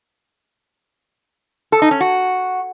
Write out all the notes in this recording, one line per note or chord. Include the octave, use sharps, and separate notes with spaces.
A4
D#4
C#4
F#4